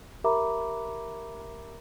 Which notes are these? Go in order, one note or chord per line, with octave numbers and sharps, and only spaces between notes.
G4 A#4 E5 A#5 B5 D6